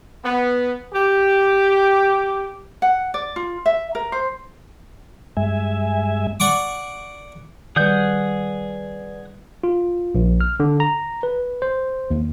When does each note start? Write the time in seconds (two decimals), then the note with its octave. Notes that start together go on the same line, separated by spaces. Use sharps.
0.24 B3
0.94 G4
2.82 F#5
3.14 D5
3.36 F4
3.66 E5
3.95 A#4
4.12 C5
5.37 G2 G#3 E5 G#5
6.40 D5 F#5 C#6 D6
7.76 D#3 G3 G#4 B4 D5 F#5 G6
9.64 F4
10.15 A#1
10.41 F6
10.60 D3
10.80 A#5
11.23 B4
11.62 C5
12.11 D#2